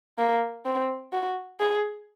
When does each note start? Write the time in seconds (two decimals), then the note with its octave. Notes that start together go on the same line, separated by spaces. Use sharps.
0.18 A#3
0.65 C4
1.12 F#4
1.60 G#4